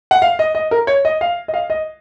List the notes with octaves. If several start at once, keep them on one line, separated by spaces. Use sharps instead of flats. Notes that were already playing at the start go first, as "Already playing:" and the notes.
F#5
F5
D#5
D#5
A#4
C#5
D#5
F5
D#5
F5
D#5